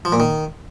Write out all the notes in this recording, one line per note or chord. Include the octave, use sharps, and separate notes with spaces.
F3
A#2
D#3